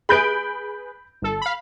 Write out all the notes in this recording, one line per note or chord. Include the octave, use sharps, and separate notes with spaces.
G#4 B4 B5 G6 D7
G1 A4
F5 B5